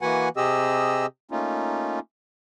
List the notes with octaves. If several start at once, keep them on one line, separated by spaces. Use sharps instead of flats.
E3 A#3 F#4 B4 F#5 G#5
C3 C4 G4 G#4 D#5 E6
A3 A#3 C#4 D#4 F4